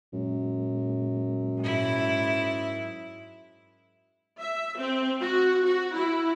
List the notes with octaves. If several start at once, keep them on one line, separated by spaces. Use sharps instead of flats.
F#2 A#2 G#3
G#2 E4
E5
C4
F#4
F#4
E4